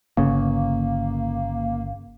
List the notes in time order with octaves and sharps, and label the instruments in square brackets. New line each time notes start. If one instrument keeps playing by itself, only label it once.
[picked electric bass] G1 C#3 [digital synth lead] A#3